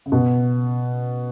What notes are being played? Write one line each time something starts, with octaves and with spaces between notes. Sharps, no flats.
C#3
B2